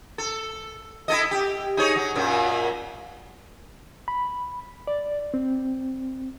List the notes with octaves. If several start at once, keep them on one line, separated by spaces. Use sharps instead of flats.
A4
E4 A4 D#5
G4
D#4 G#4 C#5
F#3
F#2 A#2 F#3
B5
D5
C4